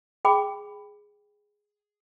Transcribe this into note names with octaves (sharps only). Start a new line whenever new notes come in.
G#4 G5 B5 D6